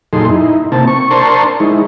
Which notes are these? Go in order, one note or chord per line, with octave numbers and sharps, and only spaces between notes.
F#2 A#2 D#4 G#4 A4 C6
D#4 E4
C3 A#3 C4 A5
C#6
D4 A#4 C5 A5 C6 C#6
G#3 D#4 E4